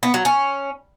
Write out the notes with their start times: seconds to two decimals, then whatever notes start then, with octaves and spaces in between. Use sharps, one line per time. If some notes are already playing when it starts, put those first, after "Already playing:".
0.03 B3
0.14 F#3
0.25 C#4